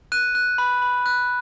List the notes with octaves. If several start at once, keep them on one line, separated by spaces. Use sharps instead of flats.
F#6 D#7
F#6
B5
B5
F#6